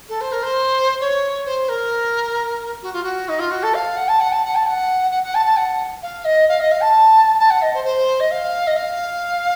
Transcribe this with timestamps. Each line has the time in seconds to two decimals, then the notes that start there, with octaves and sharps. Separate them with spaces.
0.09 A4
0.21 C5
0.32 A#4
0.43 C5
1.00 C#5
1.45 C5
1.69 A#4
2.82 F#4
2.93 F4
3.03 F#4
3.28 D#4
3.39 F4
3.51 F#4
3.63 A4
3.74 F5
3.96 F#5
4.08 A5
4.20 F#5
4.32 A5
4.44 F#5
4.55 A5
4.67 F#5
5.10 F#5
5.23 F#5
5.34 A5
5.45 A5
5.57 F#5
6.02 F5
6.24 D#5
6.48 F5
6.60 D#5
6.71 F5
6.82 A5
7.39 A5
7.50 F#5
7.62 D#5
7.74 C5
7.84 C5
8.20 D#5
8.31 F5
8.67 D#5
8.76 F5